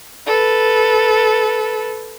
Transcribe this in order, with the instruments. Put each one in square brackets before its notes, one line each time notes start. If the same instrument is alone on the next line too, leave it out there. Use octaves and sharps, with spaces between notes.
[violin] A4 B4